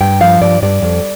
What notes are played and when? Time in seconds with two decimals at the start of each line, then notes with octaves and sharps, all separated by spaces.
0.01 G2 G5
0.21 F3 F5
0.41 G2 D5
0.62 G2 D5
0.82 F2